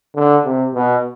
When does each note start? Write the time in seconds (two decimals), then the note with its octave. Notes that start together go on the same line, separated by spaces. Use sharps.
0.15 D3
0.45 C3
0.74 B2